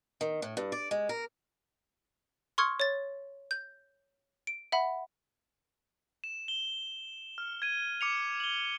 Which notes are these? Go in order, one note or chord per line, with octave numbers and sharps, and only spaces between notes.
D#3
A2
G2
D5
G#3
A#4
C6 C#6 D#6 F6 G#6 C#7
C#5 A6
G6
D7
E5 F#5 B5
E7
G7
F6
G#6 D#7
D6 C#7 F7
F#7 G7